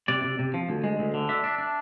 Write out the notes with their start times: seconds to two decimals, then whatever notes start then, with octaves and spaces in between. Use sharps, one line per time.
0.08 C3 D5
0.24 C3
0.39 C3
0.54 F3
0.69 D2
0.84 G#3
0.99 D2
1.14 D3
1.29 D4 E5
1.44 D4
1.58 D4